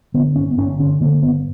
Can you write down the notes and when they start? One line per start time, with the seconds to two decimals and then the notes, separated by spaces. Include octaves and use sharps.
0.14 D3 B3
0.36 G1 C#4
0.51 B3
0.58 G1 C#4
0.79 D3 C#4
1.01 D3 A#3
1.22 G1 B3